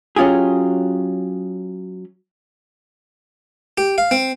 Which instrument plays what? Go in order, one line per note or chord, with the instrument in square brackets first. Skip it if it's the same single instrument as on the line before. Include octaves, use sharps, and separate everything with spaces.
[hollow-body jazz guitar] F#3 C#4 F4 G4 G#4
[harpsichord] G4
F5
C4